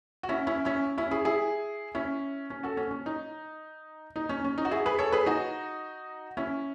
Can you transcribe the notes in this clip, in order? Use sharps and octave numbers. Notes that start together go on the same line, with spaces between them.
F#4
C#4 E4
C#4 E4
C#4 E4
C#4 E4
E4 G#4
E4 G#4
C#4 E4
C#4
F#4 A4
C#4
C#4
D#4
D#4
C#4
C#4
D#4
F#4
E4 G#4
G#4 B4
A4 C#5
G#4 B4
D#4 F#4
C#4 E4